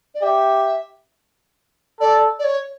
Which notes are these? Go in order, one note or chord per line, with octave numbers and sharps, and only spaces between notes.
D5
G4 E5
A4 D5
D5
C#5